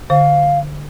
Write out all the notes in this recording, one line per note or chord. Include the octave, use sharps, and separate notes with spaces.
D3 C5 F5